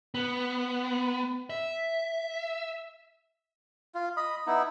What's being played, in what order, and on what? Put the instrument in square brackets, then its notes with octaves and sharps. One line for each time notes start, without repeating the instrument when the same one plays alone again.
[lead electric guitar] B3
E5
[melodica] F4
D#5 B5 D#6
B3 D#4 E4